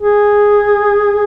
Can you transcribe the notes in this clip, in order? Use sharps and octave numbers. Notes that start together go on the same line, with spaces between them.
G#4